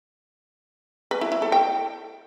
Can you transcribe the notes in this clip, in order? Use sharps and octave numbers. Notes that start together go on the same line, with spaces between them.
B4
E4
E4
A4
G5